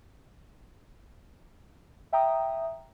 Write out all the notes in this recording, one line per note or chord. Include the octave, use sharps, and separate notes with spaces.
E5 G5 A#5 D#6